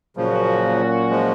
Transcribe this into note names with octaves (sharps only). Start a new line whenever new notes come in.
A#2 C#3 F3 F#3 C#4 F#4
F3 G#3